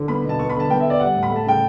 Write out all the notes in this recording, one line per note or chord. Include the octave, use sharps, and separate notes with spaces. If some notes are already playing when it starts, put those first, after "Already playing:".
Already playing: D3
B3 B5
B2
A5
B3 C#6
B5
D3 A5
B3 G5
E5
D3
D5
G3 F#5
A2
B5
A3 A5
C#3 G5